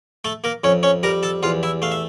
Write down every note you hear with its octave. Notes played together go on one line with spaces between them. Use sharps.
A3 A4
A#3 A#4
F2 C#4 C#5
C#4 C#5
G3 A#4 A#5
A4 A5
E2 F4 F5
E4 E5
A3 F5
E5